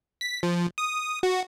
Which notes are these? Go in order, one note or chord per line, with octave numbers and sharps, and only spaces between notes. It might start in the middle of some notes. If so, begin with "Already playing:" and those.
B6
F3
D#6
F#4